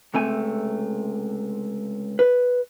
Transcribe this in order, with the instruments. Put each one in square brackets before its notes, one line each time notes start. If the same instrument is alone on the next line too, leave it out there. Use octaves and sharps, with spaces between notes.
[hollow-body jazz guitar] C#2 C3 A3 G#5
B4